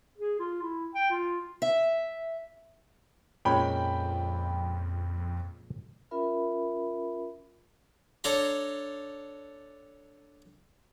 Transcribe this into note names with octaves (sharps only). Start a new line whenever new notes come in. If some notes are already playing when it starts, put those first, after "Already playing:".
G#4
F4
E4
G5
F4
E5
F2 A#2 G#3 C#4 G5 B5
C#4 F4 A#4 E5 B5
D4 A4 C#5 D5 A#5 C6